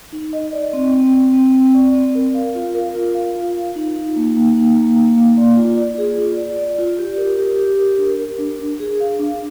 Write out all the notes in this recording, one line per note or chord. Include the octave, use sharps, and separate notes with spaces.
D#4
D#5
D5
C4
C4
C4
C4
C4
D5
C4
A#4
F5
F4
A#4
F4
F5
F4
F4
D#4
D#4
A#3
A#3
D#4
A#3
A#3
A#3
D5
F4
D5
G#4
F4
D5
D5
F4
G4
A#4
G4
G4
A#4
D4
A#4
D4
D4
G#4
F5
D4